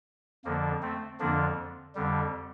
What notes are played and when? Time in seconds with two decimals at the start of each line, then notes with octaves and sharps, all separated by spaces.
0.45 F2 D3 F3 A#3
0.82 A3 C4
1.20 F2 D3 F3 A#3 D4
1.95 F2 D3 G3